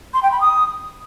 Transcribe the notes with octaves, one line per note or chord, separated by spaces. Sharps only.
C6
G5
B5
D#6